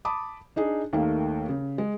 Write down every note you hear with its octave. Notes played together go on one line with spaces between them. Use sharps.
A5 B5 D6 D#6
D4 D#4 G#4
D#2 D#3 A3 A#3 F5
C#3
G#3